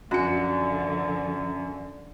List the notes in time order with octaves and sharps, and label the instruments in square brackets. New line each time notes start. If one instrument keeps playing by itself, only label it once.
[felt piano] F#2 C#7 [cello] D3 F3 [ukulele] F#4